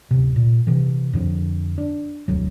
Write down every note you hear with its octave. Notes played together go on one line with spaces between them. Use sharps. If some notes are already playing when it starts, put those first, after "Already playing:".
D1 C3
A#2
C3 E3
F2 D3 F3
D4
E1 D2 F#3